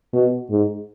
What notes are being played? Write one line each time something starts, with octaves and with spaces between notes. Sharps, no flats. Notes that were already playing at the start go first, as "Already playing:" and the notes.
B2
G#2